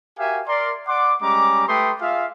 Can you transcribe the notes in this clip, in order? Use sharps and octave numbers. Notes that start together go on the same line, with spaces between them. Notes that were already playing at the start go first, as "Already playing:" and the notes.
F#4 G4 A#4 E5 F5 G#5
A#4 D5 C6
D5 F#5 C6 D6
G3 G#3 C#4 A#5 D6
A3 G4 B4 G5 C6 D#6
F4 G#4 E5 F5